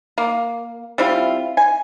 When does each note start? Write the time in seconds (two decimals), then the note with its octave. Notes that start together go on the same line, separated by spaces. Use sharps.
0.18 A#3
0.98 G3 C4 E4 F4
1.57 G#5